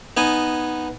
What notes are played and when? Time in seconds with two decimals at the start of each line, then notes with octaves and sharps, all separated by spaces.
0.17 B3 D#4 G#5